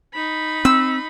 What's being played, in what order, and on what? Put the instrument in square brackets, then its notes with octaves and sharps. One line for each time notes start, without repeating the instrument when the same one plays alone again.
[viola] D#4 B5
[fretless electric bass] C4 [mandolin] E6